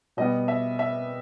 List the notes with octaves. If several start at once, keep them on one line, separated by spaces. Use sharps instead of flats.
B2 G3 B3 D#5
E5
E5